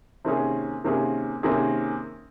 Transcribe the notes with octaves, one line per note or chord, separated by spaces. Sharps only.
C3 D#3 A#3 C#4 G#4
C3 D#3 A#3 C#4 G#4
C3 D#3 A#3 C#4 G#4